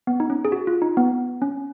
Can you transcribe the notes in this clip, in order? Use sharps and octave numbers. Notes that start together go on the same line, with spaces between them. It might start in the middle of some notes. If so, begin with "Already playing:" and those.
B3
D#4
C#4
G#4
F#4
F4
D#4
B3
C#4